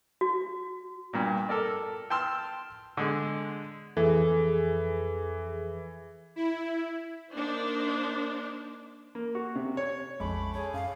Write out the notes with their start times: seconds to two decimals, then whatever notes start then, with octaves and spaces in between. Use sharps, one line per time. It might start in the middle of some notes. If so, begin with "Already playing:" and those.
0.21 F#4
1.13 G2 A#2
1.49 A4 A#4 D5
2.10 G5 A5 C6 E6 F6
2.97 D3 G#3
3.97 F2 E3 G#4 A4
6.36 E4
7.33 A#3 D4 D#4 C5
9.15 A#3
9.35 F#4
9.56 C3
9.77 C#5
10.20 A#1 F2 G#3 A3 C#4 B5 D6
10.54 G#4 C#5
10.74 F#2 F5